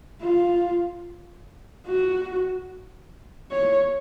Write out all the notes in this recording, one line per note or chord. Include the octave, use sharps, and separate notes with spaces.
F4
F#4
C#5